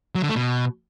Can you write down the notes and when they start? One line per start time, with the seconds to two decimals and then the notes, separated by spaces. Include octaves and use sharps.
0.15 F#3
0.22 D3
0.29 A3
0.36 B2